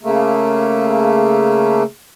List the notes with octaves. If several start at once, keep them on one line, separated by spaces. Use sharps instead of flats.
C#3 A3 A#3